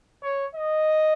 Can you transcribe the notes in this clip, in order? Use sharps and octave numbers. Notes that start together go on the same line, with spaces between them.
C#5
D#5